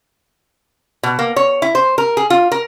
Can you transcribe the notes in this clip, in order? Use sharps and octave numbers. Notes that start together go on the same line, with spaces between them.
B2
A#3
C#5
E4
C5
A#4
G#4
F4
A#4